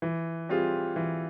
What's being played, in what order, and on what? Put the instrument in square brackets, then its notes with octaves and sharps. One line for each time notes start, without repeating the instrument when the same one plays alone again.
[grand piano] E3
G3 C4 F4 G#4
E3